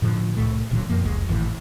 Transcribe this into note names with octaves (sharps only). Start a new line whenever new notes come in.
A2 D3 F3
C2 A2 A3
D1 A#2 D3 F#3
F#2 F3 A#3
F1 C#2 G#3
G#1 D#2 A2 E3